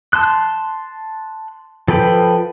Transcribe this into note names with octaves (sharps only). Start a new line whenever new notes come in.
A5 C6 F#6
F3 A4 B4 G5 B5